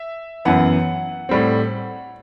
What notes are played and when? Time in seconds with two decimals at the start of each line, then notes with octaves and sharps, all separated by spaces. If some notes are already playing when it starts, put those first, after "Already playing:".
Already playing: E5
0.45 F#2 E3 B3 F#5
1.29 A2 G3 C4